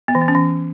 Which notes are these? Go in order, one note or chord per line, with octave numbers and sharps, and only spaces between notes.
B3
E3
B3
C#4
E3